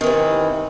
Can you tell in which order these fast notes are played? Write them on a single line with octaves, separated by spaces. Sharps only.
D#3 E3 C3